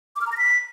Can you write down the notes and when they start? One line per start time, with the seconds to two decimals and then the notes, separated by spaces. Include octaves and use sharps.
0.16 D6
0.21 F6
0.27 A#5
0.32 A#6
0.37 B6